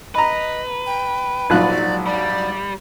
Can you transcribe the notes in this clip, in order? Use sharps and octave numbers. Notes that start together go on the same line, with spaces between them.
B4 D#5 A#5 B5
G5
A#1 G#2 F#3 F4 D5 F#6
G3 D5